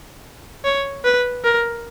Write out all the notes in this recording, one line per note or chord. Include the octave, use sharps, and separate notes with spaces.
C#5
B4
A#4